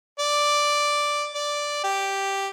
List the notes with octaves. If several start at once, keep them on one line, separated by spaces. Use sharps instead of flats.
D5
D5
G4